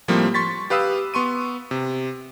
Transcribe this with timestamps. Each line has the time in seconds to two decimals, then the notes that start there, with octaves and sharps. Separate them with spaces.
0.08 A2 F3 G3 A#3 C4
0.34 C6 C#6 A6 B6
0.70 G4 B4 F5 D#6 E6
1.14 B3 C6 C#6 D#7
1.71 C3